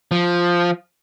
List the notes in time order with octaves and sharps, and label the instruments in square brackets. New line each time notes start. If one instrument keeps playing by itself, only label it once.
[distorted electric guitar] F3